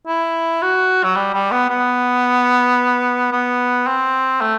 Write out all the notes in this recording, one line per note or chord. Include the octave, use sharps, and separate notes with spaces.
E4
F#4
F#3
G3
G3
B3
B3
B3
C4
A3